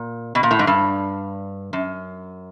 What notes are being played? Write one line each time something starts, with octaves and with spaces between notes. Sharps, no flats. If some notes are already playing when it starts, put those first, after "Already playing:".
Already playing: A#2
B2
A#2
A2
G#2
G2
F#2